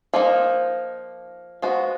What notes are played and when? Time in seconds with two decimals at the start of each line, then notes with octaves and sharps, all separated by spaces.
0.14 F3 A#3 D#4
1.62 F3 G#3 B3 F#4